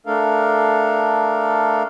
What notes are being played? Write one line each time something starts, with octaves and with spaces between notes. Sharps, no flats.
A3 D4 A4 A#4 F5